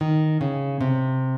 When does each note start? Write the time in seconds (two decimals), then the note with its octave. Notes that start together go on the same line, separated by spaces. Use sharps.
0.01 D#3
0.41 C#3
0.81 C3